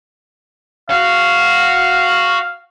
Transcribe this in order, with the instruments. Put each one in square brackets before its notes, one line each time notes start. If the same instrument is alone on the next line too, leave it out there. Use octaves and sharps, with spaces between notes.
[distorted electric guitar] F#4 [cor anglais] F5